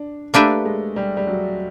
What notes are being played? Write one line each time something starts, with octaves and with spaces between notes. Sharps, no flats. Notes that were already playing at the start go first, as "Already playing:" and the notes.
Already playing: D4
A3 A#3 D4 G4 B4 E5
G#3
G3
G3
F#3